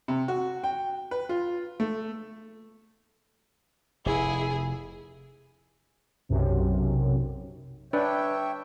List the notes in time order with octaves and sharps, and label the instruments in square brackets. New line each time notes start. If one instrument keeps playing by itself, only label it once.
[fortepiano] C3
F#4
G5
B4
F4
A3
[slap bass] F1 [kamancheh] E4 G#4
[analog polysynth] B1 F#2 C3
[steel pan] D4 [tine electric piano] B4 [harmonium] C#5 E5 G5